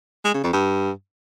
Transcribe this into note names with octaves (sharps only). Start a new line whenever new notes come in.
G#3
C#3
F2
G2